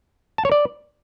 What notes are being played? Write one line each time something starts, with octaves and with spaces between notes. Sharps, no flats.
A5
C#5
D5